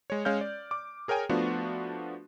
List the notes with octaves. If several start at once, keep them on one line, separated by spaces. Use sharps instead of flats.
G#3 C#5
G#3 C#4 C#5 F5 F6 G6
D5
D6
G#4 A#4 C#5 G5 G#5
F3 A3 B3 D4 F4 F#4